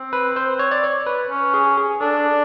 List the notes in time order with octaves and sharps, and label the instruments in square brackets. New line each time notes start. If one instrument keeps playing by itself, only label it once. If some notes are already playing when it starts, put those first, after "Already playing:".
Already playing: [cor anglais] C4
[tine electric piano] B4
C5
C#5
D5
C#5
B4
[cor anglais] C#4
[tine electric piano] G#4
G#4
[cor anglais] D4 [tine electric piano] A4